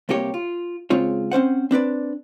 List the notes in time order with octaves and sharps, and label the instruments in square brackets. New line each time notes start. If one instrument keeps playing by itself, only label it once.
[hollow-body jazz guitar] C2 C3 A#3 G4 C#5
F4
C#3 G#3 C4 F4 C#5
C4 C#4 C5 F#5
C4 D4 B4 D5